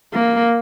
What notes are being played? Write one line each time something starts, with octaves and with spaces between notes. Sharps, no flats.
A#3